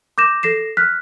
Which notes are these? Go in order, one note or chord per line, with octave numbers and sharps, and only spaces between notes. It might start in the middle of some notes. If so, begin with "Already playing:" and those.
D6 G6 A#6 E7
A4 A#6 C7 E7
F6 F#6 B6